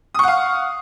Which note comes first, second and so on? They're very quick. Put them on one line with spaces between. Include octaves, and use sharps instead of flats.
D#6 C#6 F#5 F5